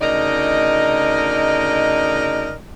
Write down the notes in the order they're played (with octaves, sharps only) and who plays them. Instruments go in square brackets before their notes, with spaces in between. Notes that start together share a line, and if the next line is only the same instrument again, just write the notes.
[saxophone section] D2 C#3 D#4 A#4 D5 D#5